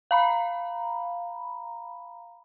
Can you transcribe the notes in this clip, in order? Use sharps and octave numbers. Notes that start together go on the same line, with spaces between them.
F5 A#5 B5